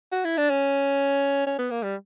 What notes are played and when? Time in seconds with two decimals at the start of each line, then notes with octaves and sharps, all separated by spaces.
0.12 F#4
0.25 E4
0.38 D4
0.50 C#4
1.47 C#4
1.59 B3
1.71 A#3
1.83 G3